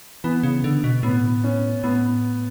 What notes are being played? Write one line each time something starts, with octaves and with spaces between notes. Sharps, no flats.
E3 B3
C#3
D3
B2
A2 B3
C#4
A2 B3